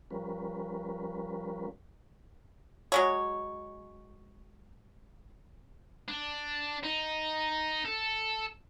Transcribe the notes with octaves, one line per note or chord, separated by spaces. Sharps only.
F3 G3 C#4 A#4 B4
F#3 G#3 C#5
D4
D#4
A4